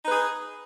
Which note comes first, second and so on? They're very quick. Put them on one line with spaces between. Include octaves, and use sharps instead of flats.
D#4 B4 G#4